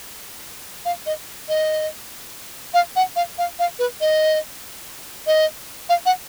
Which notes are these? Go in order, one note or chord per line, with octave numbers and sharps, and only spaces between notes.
F5
D#5
D#5
F5
F#5
F5
F5
F5
B4
D#5
D#5
F5
F#5